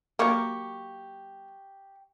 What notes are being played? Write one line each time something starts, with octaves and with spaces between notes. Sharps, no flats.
F#3 A#3 G4 C#6 D6